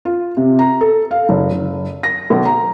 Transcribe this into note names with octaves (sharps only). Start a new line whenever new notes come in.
F4
C3
A#5
A4
F5
F#1
F#1
A#6
B1
A#5